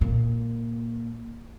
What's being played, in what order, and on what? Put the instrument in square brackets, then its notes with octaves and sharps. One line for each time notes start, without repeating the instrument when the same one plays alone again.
[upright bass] A#2